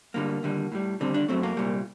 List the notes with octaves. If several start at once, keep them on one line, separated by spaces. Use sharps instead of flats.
G2 D3 G3 A#3
D#2 D3 G3
A2 G3
D#2 D3 G3 C4
D4
F#2 F#3 A3 C4
A#3
C2 A#2 G3